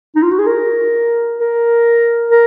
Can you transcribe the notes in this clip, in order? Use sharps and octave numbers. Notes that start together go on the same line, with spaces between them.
D#4
F4
F#4
G#4
A#4
A#4
A#4